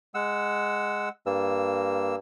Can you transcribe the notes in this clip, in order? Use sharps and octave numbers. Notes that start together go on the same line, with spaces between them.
G#3 F#5 E6
G2 A#3 E6